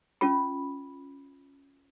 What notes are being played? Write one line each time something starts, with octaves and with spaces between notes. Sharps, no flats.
C#4 F4 B5